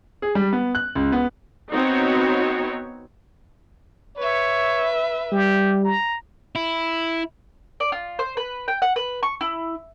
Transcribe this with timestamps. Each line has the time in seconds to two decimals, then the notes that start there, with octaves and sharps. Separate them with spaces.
0.22 G#4
0.35 G3
0.53 B3
0.75 F#6
0.95 C#2
1.12 B3
1.71 B3 C4 D#4 F#4 C#5
4.17 B4 C#5 E5
5.32 G3 G4
5.85 A#5
6.55 E4
7.80 D5
7.92 F4
8.19 C5
8.37 B4
8.68 G5
8.82 F#5
8.96 B4
9.23 C#6
9.41 E4